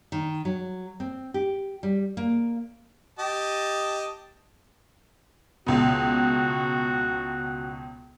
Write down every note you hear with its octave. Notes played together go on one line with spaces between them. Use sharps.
D#3
F#3
C4
G4
G3
A#3
G4 D#5 A5
C#2 B2 F#4